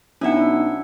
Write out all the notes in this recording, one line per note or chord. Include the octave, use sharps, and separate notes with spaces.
B1 C#4 D4 E4 E5 F#5